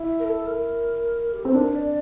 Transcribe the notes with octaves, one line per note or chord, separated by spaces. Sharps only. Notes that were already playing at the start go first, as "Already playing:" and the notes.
Already playing: E4
A#4
A4
A#4
G4
C4 A4
D4 A#4
D5